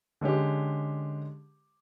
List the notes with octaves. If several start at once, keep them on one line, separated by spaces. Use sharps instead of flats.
D3 G#3 C#4 G4